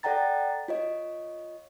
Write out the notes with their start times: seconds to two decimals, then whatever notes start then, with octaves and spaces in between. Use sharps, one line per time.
0.03 A4 D5 F#5 G5 A#5 A6
0.68 F4 C#5 D#5